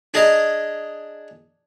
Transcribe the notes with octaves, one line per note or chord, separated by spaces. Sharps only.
D4 G#4 D#5 A#5